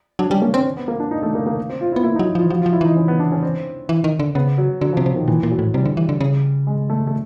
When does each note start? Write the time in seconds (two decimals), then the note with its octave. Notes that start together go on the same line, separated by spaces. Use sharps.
0.19 F#3 D4
0.30 G3 C#4
0.42 A#3 C#4
0.53 C4 C#4
0.66 C4
0.77 B3
0.88 A#3
1.00 D4
1.11 D#4
1.23 A3
1.35 A#3
1.46 A#3
1.69 C4
1.81 F4
1.92 E4
1.96 B3
2.04 A#3 E4
2.16 F#3 D#4
2.27 E4
2.35 F3 F4
2.45 E3
2.50 F3 F#4
2.62 F3 F4
2.73 E4
2.81 E3 D#4
2.96 C#4
3.08 B3
3.20 D4
3.32 C#4
3.43 C4
3.89 E3
4.04 D#3
4.19 D3
4.35 C#3 B3
4.58 F#3
4.81 D3 F#3
4.93 C3 F3
5.06 C3
5.12 B2 D#3
5.28 A#2 E3
5.43 A#2
5.51 F#3
5.59 A2
5.74 C3 G3
5.85 D3
5.97 E3
6.09 D3
6.21 C#3
6.67 G#3
6.90 A3
7.07 A3